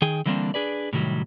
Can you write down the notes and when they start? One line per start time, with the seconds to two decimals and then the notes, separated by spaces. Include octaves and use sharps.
0.02 D#3 G#4 G5
0.26 D3 E3 G3 A#3 C4 D4
0.54 D4 G#4 B4 D5
0.93 A2 C3 D#3 F#3 G3